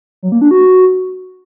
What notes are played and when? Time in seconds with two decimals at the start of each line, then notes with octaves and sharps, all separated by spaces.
0.23 F#3
0.32 A#3
0.41 D4
0.51 F#4